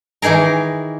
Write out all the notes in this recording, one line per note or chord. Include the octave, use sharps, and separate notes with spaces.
D#3 E3 D#4 G#4 A#4